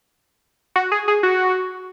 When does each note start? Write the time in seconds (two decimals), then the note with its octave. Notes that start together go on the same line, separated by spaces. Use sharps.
0.76 F#4
0.92 G#4
1.08 G#4
1.23 F#4